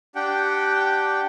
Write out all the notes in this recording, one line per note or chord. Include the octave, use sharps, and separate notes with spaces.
D4 G4 F#5 G5